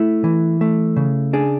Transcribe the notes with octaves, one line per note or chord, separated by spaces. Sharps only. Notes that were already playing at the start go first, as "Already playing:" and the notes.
Already playing: A3 E4
E3
A3
C#3
D4 G#4